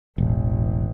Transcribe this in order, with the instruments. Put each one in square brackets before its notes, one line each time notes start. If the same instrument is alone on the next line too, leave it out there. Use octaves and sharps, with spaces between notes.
[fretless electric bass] E1 [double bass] A1